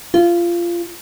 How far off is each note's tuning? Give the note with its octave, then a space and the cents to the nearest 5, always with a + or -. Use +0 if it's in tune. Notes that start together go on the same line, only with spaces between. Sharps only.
F4 -20